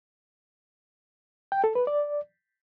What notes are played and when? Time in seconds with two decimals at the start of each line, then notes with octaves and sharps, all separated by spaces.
1.52 G5
1.64 A4
1.75 B4
1.87 D5